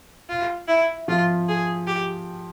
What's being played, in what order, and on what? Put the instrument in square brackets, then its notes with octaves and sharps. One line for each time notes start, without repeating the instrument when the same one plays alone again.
[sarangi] F4
E4
[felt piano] F3 [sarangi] F4
[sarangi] G#4
G4